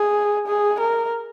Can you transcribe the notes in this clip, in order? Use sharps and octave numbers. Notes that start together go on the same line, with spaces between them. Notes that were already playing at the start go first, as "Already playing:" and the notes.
Already playing: G#4
G#4
A#4